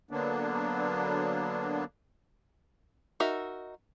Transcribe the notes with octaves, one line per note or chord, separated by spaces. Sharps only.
D3 F#3 A#3 B3 D4
D#4 F#4 A#4 E5